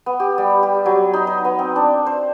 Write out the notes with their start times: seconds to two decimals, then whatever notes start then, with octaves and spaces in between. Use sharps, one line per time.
0.06 B3
0.20 G4
0.38 G3
0.63 G4
0.86 F#3
1.13 D#4
1.27 D#4
1.45 B3
1.59 C4
1.76 D4
2.06 C5